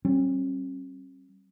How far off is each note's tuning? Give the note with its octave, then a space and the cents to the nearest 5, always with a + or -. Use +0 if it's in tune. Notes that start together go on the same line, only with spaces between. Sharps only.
G3 -35 C#4 -45